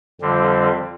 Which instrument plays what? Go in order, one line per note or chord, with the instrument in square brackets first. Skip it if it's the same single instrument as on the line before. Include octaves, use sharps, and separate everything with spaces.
[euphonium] F2 [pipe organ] D3 G3 C4